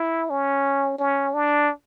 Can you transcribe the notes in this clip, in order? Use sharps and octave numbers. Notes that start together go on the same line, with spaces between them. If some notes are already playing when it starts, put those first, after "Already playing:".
Already playing: E4
C#4
C#4
D4